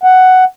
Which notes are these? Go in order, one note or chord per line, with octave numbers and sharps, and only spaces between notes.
F#5